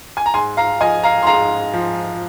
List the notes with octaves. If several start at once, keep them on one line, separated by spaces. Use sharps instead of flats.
G#5
A#5
G#2 G#5 C6
F5 A#5
F3 D#5 G#5
F5 A#5
C6
G#2 F5 A#5
F3